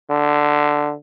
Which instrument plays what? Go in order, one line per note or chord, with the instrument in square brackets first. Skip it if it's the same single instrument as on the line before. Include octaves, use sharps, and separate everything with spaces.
[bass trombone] D3